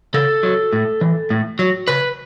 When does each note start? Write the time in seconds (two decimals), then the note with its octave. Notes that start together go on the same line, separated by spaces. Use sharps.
0.14 C#3 A4
0.43 F#3
0.73 A2
1.01 E3
1.30 A2
1.59 F#3
1.88 C#3 B4